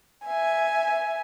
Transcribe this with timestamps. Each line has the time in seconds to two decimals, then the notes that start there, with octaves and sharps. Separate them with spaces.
0.24 E5 G#5